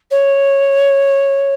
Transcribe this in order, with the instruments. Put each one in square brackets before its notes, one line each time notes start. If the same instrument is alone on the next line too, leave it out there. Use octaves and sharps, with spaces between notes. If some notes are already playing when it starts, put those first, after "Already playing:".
[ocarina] C#5